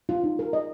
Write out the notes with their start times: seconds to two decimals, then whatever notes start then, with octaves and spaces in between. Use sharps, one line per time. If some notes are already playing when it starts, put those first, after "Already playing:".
0.09 F4
0.24 D#4
0.39 A#4
0.53 D#5